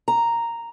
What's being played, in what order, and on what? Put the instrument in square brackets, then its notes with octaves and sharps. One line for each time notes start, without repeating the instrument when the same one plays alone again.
[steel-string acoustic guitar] A#5